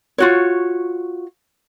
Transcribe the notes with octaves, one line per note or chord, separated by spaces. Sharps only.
F4 F#4 C#5